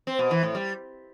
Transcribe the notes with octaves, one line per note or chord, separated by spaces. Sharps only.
C4
B2
E3
A2
G3